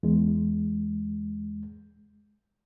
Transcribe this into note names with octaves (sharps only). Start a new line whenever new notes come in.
E2 G#3